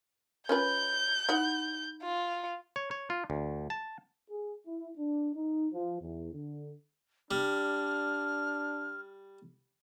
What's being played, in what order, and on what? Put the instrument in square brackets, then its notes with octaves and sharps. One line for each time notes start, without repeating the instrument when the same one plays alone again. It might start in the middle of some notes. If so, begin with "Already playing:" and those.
[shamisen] C#4 F4 B4 [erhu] G6
[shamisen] D#4 E4 F#5
[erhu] F4
[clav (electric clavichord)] C#5
C#5
F4
D2
A5
[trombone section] G#4
E4
D4
D#4
F3
E2
D3
[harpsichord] G3 [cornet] D4 [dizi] F6